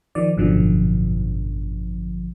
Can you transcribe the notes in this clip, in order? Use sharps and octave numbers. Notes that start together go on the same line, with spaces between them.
D#3 F3 D5
G#1 F#2 B2 D3 F3